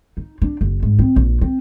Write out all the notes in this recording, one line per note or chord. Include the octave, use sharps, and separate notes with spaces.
D#4
D4
F#1
G#2
C4
A#1
C4